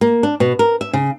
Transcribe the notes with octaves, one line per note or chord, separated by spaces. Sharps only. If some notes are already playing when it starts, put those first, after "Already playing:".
A#3
D4
B2
A#4
E5
C#3